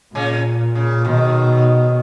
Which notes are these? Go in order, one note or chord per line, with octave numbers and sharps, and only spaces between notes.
A#2 C#3 C#4
C#3
D#2 B2 D#3